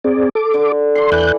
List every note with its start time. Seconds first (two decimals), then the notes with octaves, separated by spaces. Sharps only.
0.04 C4 G#4 D5
0.35 A4 D6
0.54 D3
0.95 A4 D5 C6
1.12 E2 E3 F#6 G6